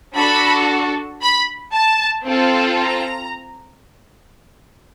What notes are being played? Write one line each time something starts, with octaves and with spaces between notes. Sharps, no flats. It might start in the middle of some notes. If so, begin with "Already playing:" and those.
D4 F#4 A4 B5
B5
A5
C4 F4 A4
A#5